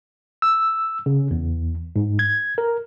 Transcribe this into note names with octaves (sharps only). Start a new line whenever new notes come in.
E6
C#3
E2
G#2
G#6
A#4